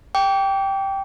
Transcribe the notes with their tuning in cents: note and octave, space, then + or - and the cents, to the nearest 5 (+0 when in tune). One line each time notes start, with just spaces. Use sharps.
G5 +0 D6 -35